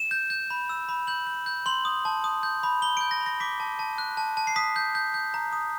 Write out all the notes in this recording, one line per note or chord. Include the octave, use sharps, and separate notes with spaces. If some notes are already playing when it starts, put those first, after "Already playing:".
Already playing: E7
G6
G6
B5
E6
B5
G6 F#7
G6
G6
C6 F#7
D#6
A5
D#6
G6
B5
B5 G7
G6 D7
A#6
B5
A#6
D6 B6
A5
A5
F#6
A5
A5
C7
D#6 B6
G6
G6
G6
A#5
D#6